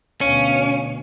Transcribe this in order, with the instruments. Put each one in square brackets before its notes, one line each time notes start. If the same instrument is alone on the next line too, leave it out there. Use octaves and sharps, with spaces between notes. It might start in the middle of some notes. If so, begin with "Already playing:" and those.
[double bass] D2 B2 [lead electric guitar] C#4 [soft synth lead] F5